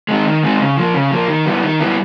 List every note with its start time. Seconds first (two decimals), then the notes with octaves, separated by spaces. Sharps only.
0.09 G#3 C4 D#4
0.26 D#3
0.43 G#3 C4 D#4
0.59 C#3
0.77 F3 A#3
0.94 C#3
1.11 F3 A#3
1.28 D#3
1.46 G3 B3 E4
1.63 D#3
1.80 G3 B3 E4